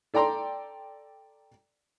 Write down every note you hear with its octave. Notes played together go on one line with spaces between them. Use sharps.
A4 D5 G5 A#5 C6